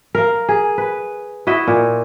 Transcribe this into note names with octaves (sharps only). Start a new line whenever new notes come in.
A#4 F5
G#4
B4
E4 F#4 D#5 E5
A#2